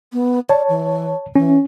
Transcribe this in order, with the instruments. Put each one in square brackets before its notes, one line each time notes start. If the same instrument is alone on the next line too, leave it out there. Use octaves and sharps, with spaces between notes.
[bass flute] B3
[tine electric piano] C#5 A5 [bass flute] D5
[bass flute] E3
[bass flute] E3 [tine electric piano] C#4